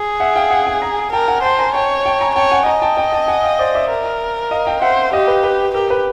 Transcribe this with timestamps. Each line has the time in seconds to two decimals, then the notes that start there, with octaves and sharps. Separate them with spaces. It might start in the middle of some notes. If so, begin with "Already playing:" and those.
Already playing: G#4
0.20 E5 F#5
0.36 F5 G5
0.51 F#5 G#5
0.67 F#5 G#5
0.82 G#5 A#5
1.12 A#4 G5 A5
1.28 F#5 G#5
1.43 C5 G5 A5
1.59 G#5 A#5
1.74 C#5 G5 A5
2.06 G5 A5
2.21 G#5 A#5
2.35 C#5 G5 A5
2.51 F#5 G#5
2.66 D#5 G#5 A#5
2.82 G5 A5
2.97 G5 A5
3.12 G5 A5
3.28 F#5 G#5
3.43 F5 G5
3.59 C5 D5
3.75 D5 E5
3.90 A#4
4.51 D#5 F5
4.67 F5 G5
4.82 C5 E5 F#5
5.13 G4 D#5 F5
5.28 B4
5.43 B4
5.74 G4 A#4
5.90 B4